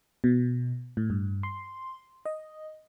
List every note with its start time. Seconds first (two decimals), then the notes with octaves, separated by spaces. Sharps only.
0.24 B2
0.97 A2
1.10 G2
1.43 C6
2.26 D#5